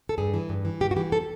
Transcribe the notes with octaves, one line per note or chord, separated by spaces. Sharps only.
A4
G2 G#4
E3
G2
E3
G2 G4
F#4
E3 G4
A4